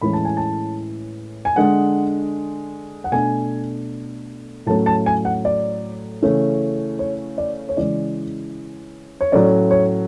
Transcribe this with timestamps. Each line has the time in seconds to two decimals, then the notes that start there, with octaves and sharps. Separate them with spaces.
0.01 A2 E3 G#3 C#4 B5
0.13 A5
0.25 G#5
0.37 A5
1.45 G#5
1.56 D3 G#3 D4 F#5
3.04 F#5
3.11 B2 A3 D4 G#5
4.66 A2 F#3 A3 C#4 A5
4.86 A5
5.06 G#5
5.25 F#5
5.45 D5
6.22 C#3 E3 A3 C#4
6.99 C#5
7.38 D5
7.69 C#5
7.77 C#3 E3 G#3 D5
9.21 C#5
9.32 A2 F#3 A3 C#4 D5
9.71 C#5